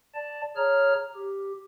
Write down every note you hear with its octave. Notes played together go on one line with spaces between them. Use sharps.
D5 A5
G#4 C#5 A#5 F6
G4